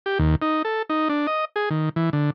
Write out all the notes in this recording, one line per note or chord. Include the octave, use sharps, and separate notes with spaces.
G4
D#2
D#4
A4
D#4
D4
D#5
G#4
D#3
E3
D3